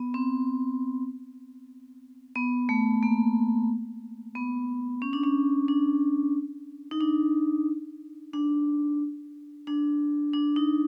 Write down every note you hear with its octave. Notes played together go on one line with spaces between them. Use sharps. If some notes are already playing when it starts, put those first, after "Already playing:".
Already playing: B3
C4
B3
A3
A#3
B3
C#4
D4
C#4
D4
D#4
D4
D4
D4
D4
D#4